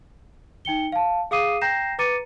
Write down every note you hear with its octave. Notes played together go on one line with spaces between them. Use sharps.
D#4 G5 C#7 G7
F5 A5
G#4 F5 D6 D#6 C7 D#7
G5 A#5 G6 A#6 C7 E7
B4 A#5 D6 A6 C#7 D#7